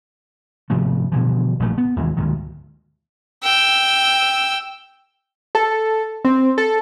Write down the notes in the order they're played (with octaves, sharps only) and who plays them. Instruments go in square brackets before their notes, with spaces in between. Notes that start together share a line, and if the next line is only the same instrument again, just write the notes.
[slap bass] G#2 C3 F3 A3
B2 D3 E3 F3
A#1 G#2 B2 A3
B3
D#2 G#2 E3
D2 G#2 D#3
[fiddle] G5 E6
[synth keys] A4
C4
A4